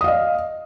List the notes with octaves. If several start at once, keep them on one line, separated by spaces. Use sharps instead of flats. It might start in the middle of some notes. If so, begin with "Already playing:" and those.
D#5 F5 D#6